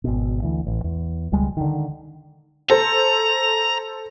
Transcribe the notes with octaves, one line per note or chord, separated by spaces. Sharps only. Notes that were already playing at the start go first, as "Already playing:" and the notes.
G#1 B2
D2 E3
A1
E2
E1 C#2 G3 G#3
D3 D#3
A4 C5 A#5